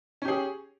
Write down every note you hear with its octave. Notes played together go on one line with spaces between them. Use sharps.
C#4 G4 G#4